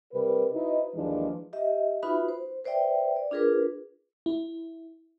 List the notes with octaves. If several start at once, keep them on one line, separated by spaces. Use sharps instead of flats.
C3 G3 A#4 B4
D#4 E4 F#4 B4 C5 D#5
D#2 G#2 E3 F3 G#3 D4
G4 D#5 E5
D#4 F4 F#4 B4 E5 B5
C5
B4 C5 D5 E5 G5
D5
D4 F4 G#4 A#4 B4
E4